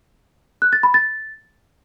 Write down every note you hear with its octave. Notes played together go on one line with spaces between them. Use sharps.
F#6
A6
B5
A6